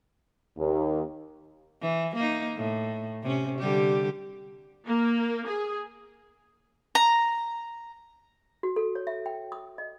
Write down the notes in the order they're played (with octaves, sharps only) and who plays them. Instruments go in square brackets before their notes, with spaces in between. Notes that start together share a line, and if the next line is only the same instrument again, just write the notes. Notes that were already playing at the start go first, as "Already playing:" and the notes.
[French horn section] D#2
[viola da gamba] E3
A#3 D#4
A2
C3 C#4
D3 G3 G4
[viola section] A#3
G#4
[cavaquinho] A#5
[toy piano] F#4
A4
C#5
E5
G5
D#6
D#5